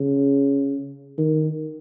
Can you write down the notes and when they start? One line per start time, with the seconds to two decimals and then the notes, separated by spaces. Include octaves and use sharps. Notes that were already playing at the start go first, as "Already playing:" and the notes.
Already playing: C#3
1.18 D#3